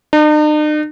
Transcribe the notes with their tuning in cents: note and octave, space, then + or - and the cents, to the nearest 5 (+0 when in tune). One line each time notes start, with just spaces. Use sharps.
D#4 -45